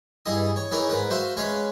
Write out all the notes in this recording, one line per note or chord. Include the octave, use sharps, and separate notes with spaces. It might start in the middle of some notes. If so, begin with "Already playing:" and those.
G2 E3 G#4 D#5 D#6
C#5
E3 B3 D#4 G#4 A#4 C#5
G#2 A#4 B4
F#4 C5 E5 F5
G#3 C#4 B4 C#5 F5